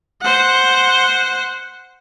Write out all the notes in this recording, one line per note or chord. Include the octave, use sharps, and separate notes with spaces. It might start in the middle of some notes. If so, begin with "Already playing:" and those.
C5 F#5